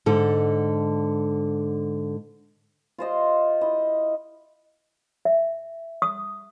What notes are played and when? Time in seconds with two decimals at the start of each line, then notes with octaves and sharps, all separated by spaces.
0.06 G#2 D3 A4
2.98 F4 C5 D#5
3.61 E4 D#5
5.25 E5
6.02 D#6